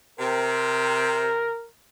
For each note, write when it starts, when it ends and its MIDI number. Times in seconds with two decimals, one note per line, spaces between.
0.20 1.53 48
0.20 1.67 70